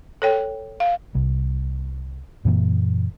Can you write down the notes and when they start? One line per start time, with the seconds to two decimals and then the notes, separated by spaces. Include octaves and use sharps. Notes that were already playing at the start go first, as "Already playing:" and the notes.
0.22 A4 C#5 G5
0.80 F5
1.15 C2
2.45 F#2 A#2 E3 A#3